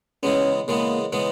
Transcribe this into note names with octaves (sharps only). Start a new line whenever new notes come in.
C#3 E3 G#3 B3 C#4
C#3 E3 G#3 A#3 B3
C#3 E3 G#3 B3